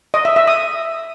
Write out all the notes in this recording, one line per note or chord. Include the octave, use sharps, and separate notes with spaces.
D#5
E5
E5
D#6